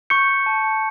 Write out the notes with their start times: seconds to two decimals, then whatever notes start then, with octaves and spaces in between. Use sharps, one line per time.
0.10 C#6 G6 C#7
0.29 C#6
0.46 A5
0.64 A5